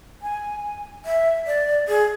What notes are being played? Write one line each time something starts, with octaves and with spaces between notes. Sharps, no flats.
G#5
E5
D5
G#4